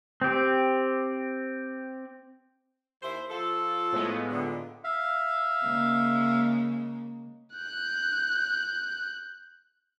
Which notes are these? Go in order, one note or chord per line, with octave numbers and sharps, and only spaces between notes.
C4 G4
D#2 E4 C5
F3 F4 A4
A2 G#3 B3
A#2 D3
E5 F5
C#3 G#3 A#3
F#6 G6